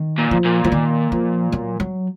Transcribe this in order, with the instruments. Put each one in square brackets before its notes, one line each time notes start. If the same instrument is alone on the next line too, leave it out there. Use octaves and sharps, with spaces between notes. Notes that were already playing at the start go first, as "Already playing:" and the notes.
Already playing: [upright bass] D#3
[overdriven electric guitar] A#2
[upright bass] F3
[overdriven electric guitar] A#2
[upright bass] F3
D#3
F3
F#3
F#3